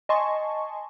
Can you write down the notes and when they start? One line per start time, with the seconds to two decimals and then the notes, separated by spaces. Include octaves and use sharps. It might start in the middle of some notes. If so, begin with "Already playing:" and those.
0.09 D#5 G#5 A5 C6 C#6